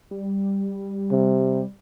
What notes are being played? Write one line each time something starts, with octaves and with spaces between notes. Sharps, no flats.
G3
C3